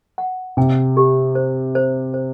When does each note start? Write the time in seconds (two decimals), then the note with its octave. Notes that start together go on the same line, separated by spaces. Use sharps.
0.18 F#5
0.57 C3 G5
0.97 G4
1.35 C5
1.75 C5
2.14 C5